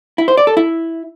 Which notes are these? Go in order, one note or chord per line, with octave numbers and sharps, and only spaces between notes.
E4
C5
D5
A4
E4